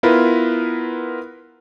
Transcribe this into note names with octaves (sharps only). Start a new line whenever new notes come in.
B3 E4 F4 A#4 B4